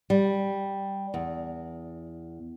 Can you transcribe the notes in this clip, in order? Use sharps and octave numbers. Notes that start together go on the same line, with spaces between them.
G3
E2